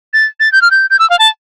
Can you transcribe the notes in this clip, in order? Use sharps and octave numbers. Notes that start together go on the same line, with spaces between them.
A6
A6
G6
F6
G6
G6
E6
F5
A5